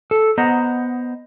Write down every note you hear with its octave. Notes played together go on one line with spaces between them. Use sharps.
A4
B3 C5 D#5 F#5 A#5